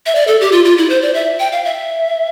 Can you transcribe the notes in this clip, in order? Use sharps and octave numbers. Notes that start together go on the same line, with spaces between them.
E5
D5
A4
G4
F4
F4
E4
C5
D5
E5
G5
F5
E5